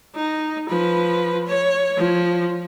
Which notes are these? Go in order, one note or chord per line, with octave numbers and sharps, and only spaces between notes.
D#4
F3 B4
C#5
F3